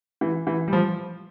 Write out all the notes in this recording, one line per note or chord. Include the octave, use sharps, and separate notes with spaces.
E3
E3
G3
F3